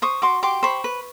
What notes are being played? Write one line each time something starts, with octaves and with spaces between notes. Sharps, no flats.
C5 C#6 D#6
F#4 C6 D6
G4 C6 D6
C5 B5 C#6
B4